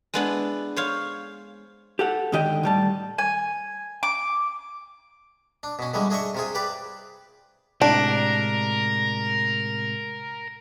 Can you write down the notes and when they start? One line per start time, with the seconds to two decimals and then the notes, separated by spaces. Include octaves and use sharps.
0.14 G#3 B3 D4 E4
0.76 C5 C#5 F5
1.99 G4 A4 F#5
2.32 G#2 D3 D#3 G4 D#5 G5
2.63 A2 G3 A5
3.18 G#5
4.03 D6
5.63 D4
5.79 B2 C#4
5.94 D3 E3 G3 G#3 C#4
6.10 D4 G#4 D#5 E5 C#6
6.35 C3 F4 G#4
6.55 G4 B4 D5
7.82 A2 C3 G#3 D4 A#4